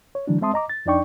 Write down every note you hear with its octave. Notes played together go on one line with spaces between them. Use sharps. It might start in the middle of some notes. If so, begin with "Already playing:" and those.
C#5
D3 E3 F#3 G#3 D4
G#3 C4 E5 A5 C6 D#6
D#5 A#5 D6
A6
F2 D4 D#4 D5 G5 C#6